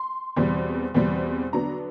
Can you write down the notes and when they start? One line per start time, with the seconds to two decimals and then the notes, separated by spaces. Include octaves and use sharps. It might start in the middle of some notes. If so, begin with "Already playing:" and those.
Already playing: C6
0.36 E2 B2 G3 C4
0.94 E2 B2 G3 C4
1.53 D3 F#3 B3 D4 A#5